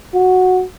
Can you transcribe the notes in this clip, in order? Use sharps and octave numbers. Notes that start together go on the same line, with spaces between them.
F#4